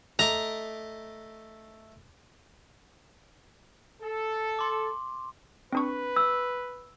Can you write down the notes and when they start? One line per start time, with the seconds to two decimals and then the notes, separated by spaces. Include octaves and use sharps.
0.19 A3 D#5 A#5 D6
4.02 A4
4.59 C6 D6
5.73 C4 D4 B4 C#6
6.16 E6